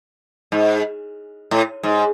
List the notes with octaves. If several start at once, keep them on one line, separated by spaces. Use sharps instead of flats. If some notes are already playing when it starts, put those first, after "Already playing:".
G#2
A2
G#2